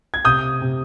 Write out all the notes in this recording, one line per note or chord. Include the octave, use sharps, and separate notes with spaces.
G#6
C3 D#6 G6
C3